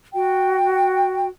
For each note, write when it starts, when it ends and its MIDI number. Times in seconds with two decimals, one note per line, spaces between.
0.13 1.26 66
0.13 1.26 79